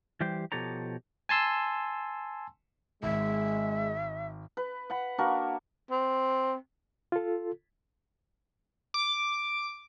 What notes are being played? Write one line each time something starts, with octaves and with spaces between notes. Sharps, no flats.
E3 G3 G4 C5
B2 F3 G4 A4 C#5 A#5
G#5 A5 C6 E6
G#1 G#3 E5
B4
F#5 B5
A#3 D4 F#4 A#4
C4
F4 A4
D6